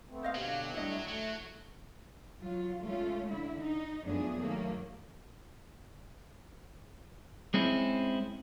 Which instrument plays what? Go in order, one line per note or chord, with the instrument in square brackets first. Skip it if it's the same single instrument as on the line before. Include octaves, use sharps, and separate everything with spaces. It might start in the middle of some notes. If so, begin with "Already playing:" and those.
[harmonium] A3 B3 C4
[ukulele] C5 D#5 F5
[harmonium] B2 D3 G4 [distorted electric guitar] F#3 [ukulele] F5
[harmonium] G3 A3 D4 [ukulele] E4 D#5
[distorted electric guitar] F#3 [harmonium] A3
[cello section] F#3 F4
G#3 A3 C#4 F4
D3 E4
D#4
F#2 F3 A3 B3 D4 G#4
D#3 F#3 A3 A#3
[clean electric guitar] G#3 C4 C#4 E4